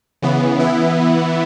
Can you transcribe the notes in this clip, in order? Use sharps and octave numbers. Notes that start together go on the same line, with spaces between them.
C#3 E3 B3
E3 B3 E4